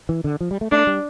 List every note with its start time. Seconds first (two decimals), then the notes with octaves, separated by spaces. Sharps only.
0.09 E3
0.24 D3
0.41 F3
0.51 G3
0.61 A3
0.72 A3 D4
0.87 G3